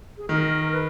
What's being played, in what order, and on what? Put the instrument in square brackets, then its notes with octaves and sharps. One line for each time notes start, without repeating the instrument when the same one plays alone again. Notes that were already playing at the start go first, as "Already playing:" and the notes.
[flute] G#4
[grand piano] D#3 [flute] A#4
[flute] B4